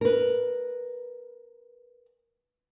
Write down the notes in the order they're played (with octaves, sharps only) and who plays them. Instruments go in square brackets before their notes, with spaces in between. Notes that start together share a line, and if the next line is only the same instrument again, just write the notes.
[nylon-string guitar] A#4 B4